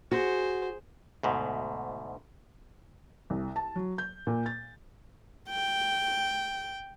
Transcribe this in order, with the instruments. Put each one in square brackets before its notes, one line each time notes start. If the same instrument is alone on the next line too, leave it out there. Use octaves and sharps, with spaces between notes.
[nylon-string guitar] F#4 [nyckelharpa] G#4 C5
[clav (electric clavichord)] D2 G#2 B2
[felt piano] C2
A5
F#3
G6
A#2
A6
[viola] G5